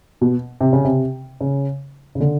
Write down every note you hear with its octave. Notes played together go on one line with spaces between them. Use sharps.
B2
C3
C#3
C3
C#3
C#3
D3